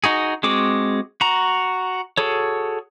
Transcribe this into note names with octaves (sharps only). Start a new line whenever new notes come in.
D#4 F#4 G#4
G#3 C4 F#4 G#4 D6
F#4 A#5
F#4 G#4 A4 C#5